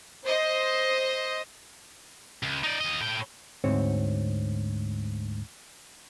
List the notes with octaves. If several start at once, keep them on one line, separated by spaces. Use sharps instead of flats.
C5 D#5
C#2
D#4 D5
D#2 D#5
A2 G5
D2 G#2 C4 C#5